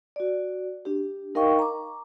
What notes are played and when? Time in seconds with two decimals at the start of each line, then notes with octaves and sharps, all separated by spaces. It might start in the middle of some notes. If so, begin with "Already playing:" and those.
0.16 F#4 D5
0.85 D4 G4
1.35 D#4 A#4 D#5 F5 G5 C#6
1.59 A#5 D6